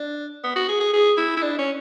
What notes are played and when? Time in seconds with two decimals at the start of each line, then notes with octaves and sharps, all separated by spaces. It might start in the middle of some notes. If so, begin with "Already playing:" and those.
Already playing: D4
0.44 B3
0.56 F#4
0.68 G#4
0.80 G#4
0.93 G#4
1.17 E4
1.37 E4
1.42 D4
1.58 C#4